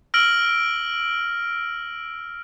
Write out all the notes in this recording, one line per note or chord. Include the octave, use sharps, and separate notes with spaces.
E6 F6 A#6 D7 F#7